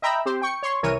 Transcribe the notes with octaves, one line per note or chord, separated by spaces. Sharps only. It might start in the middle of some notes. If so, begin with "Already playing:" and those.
D#5 E5 G5 A#5 B5 E6
C4 G4 C5
G5 C#6 C#7
C#5 C6 C#6
C2 E3 A#4 C#5 D#7